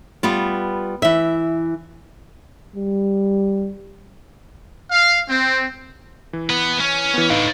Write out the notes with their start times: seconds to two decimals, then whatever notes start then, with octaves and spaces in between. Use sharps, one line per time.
0.23 G3 B3 F4
1.02 E3 E5
2.76 G3
4.91 F5
5.29 C4
6.33 E3
6.50 B3 B4
6.80 C#4
7.14 E3 B3
7.30 A2 D3 D#4 B4 F5